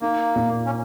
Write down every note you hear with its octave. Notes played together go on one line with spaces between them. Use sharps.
A#3 D#4
A#2
C#4